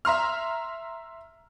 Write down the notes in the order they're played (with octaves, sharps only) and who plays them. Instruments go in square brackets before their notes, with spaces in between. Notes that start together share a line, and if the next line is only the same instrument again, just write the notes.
[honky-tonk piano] E5 A#5 C6 F6